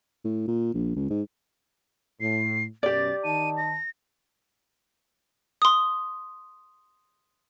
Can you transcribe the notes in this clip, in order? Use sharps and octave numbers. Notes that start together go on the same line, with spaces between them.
A2
A#2
A#1
C#2
G#2
A2 C7
F#2 B2 G4 D5 A6
D#3 D#4 A5 D#7
A#6
C6 D#6